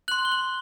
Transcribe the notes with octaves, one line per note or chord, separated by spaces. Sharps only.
C6 F#6 F#7
G7
F#7